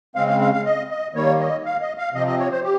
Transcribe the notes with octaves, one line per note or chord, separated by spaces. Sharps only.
C#3 G#3 C4 F5
F5
F5
F5
D#5
D#5
D#3 G3 A#3 C#5
D#5
F5
D#5
F5
C3 F3 C4 D#5
D#5
C#5
C5
G4